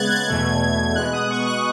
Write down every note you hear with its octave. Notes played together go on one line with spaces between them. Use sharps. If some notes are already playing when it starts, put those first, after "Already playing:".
Already playing: C#3 G#3 B3 F#6 G#6 A6
G#6
E2 B2 A3
B2 G#3 B3 F#6
D#6
C#6
F#6